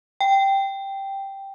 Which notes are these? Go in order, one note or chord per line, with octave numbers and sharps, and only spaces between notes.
G5